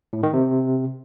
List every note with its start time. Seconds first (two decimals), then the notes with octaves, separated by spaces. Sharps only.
0.13 A2
0.23 D#3
0.33 C3